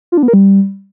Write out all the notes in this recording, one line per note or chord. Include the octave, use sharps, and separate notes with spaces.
F4
D4
B3
A#4
G3